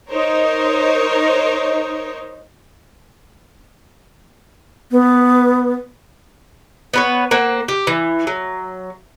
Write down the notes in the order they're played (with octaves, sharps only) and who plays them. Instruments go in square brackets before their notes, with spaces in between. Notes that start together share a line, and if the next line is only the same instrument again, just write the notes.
[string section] D#4 A#4 C5 C#5
[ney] B3
[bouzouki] B3 B4 C#5
A#3 C4 F#5
G4
E3
F#3